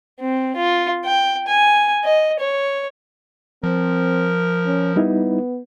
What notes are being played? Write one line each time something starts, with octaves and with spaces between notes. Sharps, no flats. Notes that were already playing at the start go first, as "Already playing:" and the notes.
C4
F4
G5
G#5
D#5
C#5
F3 C4 A#4
C#4
G3 B3 D#4 E4